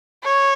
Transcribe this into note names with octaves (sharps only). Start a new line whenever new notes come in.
C#5